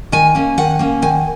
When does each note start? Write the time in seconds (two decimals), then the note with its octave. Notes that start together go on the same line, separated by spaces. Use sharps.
0.12 D#3 G#5
0.35 A#3 C#4
0.58 D#3 F#5
0.79 A#3 C#4
1.02 D#3 G#5